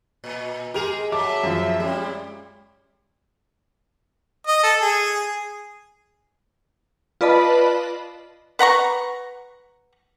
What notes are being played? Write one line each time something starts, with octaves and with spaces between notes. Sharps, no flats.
A#2
G#3 G4 G#4 A#4 F7
F#3 E5 A5 D6
F#2 F3
A#2 G3 G#3 C#4
D#5
A4
G#4
F4 B4 D5 D#5 A5 B5
B4 F#5 A#5 C#6